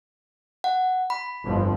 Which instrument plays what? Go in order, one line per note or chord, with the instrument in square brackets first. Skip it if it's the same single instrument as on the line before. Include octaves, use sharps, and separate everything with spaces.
[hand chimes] F#5
B5
[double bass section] G1 F2 F3